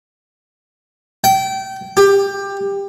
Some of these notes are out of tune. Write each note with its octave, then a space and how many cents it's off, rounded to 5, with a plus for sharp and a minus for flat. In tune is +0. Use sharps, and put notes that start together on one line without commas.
G5 -25
G4 +20